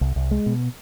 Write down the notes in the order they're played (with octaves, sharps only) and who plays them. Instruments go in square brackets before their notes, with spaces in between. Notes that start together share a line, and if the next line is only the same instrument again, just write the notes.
[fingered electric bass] C2
C2
G#3
B2